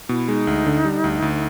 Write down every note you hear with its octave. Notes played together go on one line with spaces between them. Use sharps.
B2 E4
G#3 D#4
D2
D3
G3
D2
D2